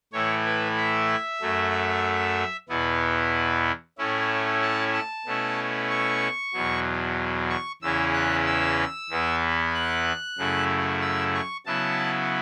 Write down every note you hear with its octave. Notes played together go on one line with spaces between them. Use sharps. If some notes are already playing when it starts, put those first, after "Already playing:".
A2 E3 A3 E4 C#5
B4
E5
F#2 F#3 A3
E2 B2 B3 E4
A2 A3 C#4 E4
A5
A5
B2 A3 C#4 E4
C#6
E2 B2 F#3
C#6
E2 C#3 E3 C#4 E4 E6
F#6
E6
E2 E3 B3 E4
F#6
F#2 C#3 A3 E4
E6
C#6
C#3 F#3 B3 E4 A5